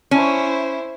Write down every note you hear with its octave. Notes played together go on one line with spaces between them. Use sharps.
C#4 E4 C5